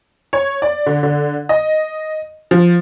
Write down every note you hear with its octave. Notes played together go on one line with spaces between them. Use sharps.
C#5
D5
D3
D3
D#5
F3